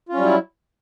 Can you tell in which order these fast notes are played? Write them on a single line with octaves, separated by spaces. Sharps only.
F4 C#4 G3 F#3 E4